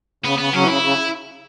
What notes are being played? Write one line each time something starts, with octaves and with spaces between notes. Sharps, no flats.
C#3 B3
C#3 B3
C#3 F#3 C#4
E3
C#3 E4
C#3